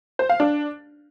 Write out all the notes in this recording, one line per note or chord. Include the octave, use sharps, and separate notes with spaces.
C5
F5
D4